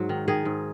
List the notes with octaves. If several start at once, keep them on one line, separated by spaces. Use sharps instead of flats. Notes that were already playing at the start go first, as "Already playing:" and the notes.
Already playing: G#2 F#3 F#4
D#3
D#3 G#4
G#2